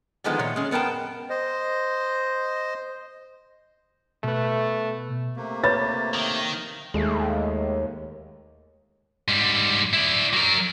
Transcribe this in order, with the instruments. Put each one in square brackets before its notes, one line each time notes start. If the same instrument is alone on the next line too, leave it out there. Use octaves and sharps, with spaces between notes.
[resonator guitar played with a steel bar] D3 D#3 F3 G#3 A3 B3
A#2 D#3 C#5
G#3 C#4
F#2 B3 A#4 G5 A5
[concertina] C5 D#5
[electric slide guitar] B2 B4 [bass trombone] A3
[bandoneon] C3 A3 A#3
[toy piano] B4 C#5 B5 [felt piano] A6
[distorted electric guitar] D#3
[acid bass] D#2 [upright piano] G#3 A3
[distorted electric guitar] G#2 G3
E4 D5
F#3 A#4